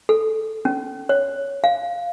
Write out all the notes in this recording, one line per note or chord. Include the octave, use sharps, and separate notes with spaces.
A4
C#4
C#5
F5